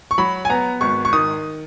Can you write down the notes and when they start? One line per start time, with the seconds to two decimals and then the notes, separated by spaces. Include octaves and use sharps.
0.11 C#6
0.18 F#3 B5
0.45 G#5
0.50 B3 A#5
0.81 G#1 C#6
1.05 C#6
1.13 D#3 D#6